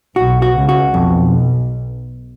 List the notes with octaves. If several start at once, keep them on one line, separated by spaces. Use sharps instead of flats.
B1 B2 F#4
F#4
C#2 C#3
F#4
B1 F2 B2